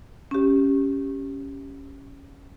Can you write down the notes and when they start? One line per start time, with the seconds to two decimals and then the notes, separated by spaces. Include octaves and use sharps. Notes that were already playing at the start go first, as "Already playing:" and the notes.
0.31 C#4 G4